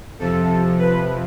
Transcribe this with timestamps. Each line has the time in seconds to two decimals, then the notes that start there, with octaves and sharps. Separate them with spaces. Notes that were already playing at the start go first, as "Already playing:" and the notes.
0.19 F2 C3 F3 A4
0.79 B4